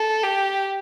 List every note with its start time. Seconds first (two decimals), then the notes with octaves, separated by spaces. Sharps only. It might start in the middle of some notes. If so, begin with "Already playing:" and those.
Already playing: A4
0.24 G4